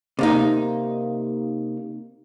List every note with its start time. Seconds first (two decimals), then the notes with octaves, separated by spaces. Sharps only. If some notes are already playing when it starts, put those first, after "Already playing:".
0.19 C3 A#3 D#4